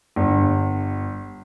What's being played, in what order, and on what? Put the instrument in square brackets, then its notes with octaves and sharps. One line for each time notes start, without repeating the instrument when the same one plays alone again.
[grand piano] G1